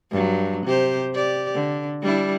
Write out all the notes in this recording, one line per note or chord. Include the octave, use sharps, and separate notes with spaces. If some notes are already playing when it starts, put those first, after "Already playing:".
G2 F#3
C3 G4 C5
G4 D5
D3
G3 D4 E4